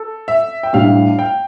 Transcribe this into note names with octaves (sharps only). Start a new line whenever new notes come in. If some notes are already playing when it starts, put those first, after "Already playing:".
Already playing: A4
E5
G5
A2 G3 D4 G4 F5
G5